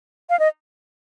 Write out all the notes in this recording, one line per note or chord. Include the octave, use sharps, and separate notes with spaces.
F5
D#5